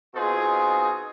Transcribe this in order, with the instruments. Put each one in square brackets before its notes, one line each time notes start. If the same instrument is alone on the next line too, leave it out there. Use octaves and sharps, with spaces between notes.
[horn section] B2 C4 D#4 F4 G#4